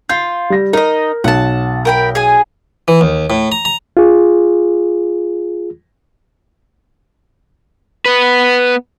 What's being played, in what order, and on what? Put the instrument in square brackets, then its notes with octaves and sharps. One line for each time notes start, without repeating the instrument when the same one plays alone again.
[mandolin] F4 [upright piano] G6
[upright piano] G3 A#6
[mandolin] D#4 D#5 [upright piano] A#4
[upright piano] B1 [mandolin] F#5 A5
[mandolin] A#4 G5 B5
G#4 G#5
[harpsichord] E3
D#2
A2
A#5
A#5
[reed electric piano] F4 G#4
[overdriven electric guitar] B3 B4